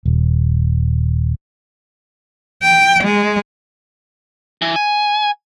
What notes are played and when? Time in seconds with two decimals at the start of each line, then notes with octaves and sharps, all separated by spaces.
0.06 D#1
2.62 G5
3.04 G#3
4.62 E3
4.76 G#5